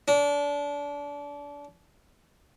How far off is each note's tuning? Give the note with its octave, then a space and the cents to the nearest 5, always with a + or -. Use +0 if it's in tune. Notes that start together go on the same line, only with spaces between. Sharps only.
D4 -30